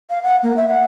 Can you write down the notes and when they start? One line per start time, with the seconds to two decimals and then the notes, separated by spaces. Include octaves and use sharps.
0.10 F5
0.23 F#5
0.43 A#3
0.57 E5
0.68 F#5